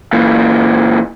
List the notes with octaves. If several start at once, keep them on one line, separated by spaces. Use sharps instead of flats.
A#2 E3